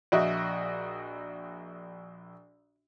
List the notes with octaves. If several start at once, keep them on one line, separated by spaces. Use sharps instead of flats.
A#1 F#4 D#5 E5